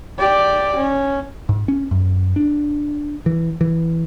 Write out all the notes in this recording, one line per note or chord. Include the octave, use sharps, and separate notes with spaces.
G4 D5
C#4
G#2
C#4
F#2
D4
E3
E3